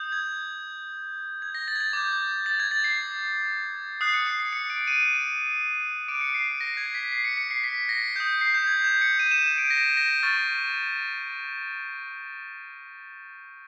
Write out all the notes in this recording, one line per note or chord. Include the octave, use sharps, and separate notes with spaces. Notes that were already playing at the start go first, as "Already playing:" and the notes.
Already playing: D#6 G6
G#6
G#6
A#6
A6
G#6
A6
D6 G6
A6
G#6
A6
C7
D#6 F#6 C7
C#7
C7
C7
C#7
D7
D#7
D6 F#6 D7
C#7
C7
A#6
G#6
B6
C7
C#7
C#7
C7
B6
A#6
D#6 G6
C7
G6
G#6
G6
C#7
D#7
E7
D7
A#6
A#6
C#6 F6 A6